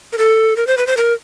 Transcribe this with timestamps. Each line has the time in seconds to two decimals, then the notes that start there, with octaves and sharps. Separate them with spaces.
0.13 A#4
0.18 A4
0.57 A#4
0.67 C5
0.78 B4
0.87 C5
0.97 A#4